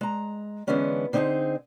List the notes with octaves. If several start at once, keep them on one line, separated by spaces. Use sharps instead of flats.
G#3 A#5
D3 E3 G#3 B3 C#4 D4
D3 C4 D#4 G4 G#4 C5